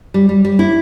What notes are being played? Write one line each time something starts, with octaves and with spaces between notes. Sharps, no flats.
G3
G3
G3
E4